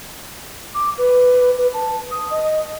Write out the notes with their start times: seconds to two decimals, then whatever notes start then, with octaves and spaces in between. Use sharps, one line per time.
0.74 D6
0.98 B4
1.58 B4
1.74 A5
2.11 D#6
2.31 D#5